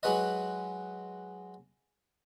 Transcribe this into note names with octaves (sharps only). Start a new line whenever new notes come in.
F#3 G#3 F#4 B4 D#5